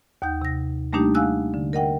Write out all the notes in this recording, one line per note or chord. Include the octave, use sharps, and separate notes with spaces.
D#2 D#4 F#5 G6
C3 A#6
G3 A3 A#3 D4 D#4 G4
F5 F#5 G#5 E6 F#6
D3
A#4 D#5 F#5 G5